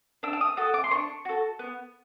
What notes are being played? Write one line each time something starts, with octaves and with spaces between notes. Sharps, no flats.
D4 E6
E6
D#6
F#4 A4 D#6
D6
C6
D4 C#6
F#4 A4
B3